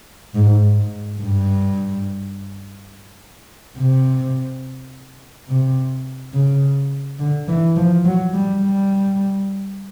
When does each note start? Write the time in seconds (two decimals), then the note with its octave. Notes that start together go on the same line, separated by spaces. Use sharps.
0.35 G#2
0.78 G#2
1.21 G2
3.78 C3
5.49 C3
6.34 C#3
7.19 D3
7.48 E3
7.77 F3
8.05 F#3
8.33 G3
8.62 G3